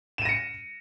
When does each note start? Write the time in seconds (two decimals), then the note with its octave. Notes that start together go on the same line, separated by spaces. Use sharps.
0.18 E7
0.22 D#7
0.25 A#6
0.29 C#7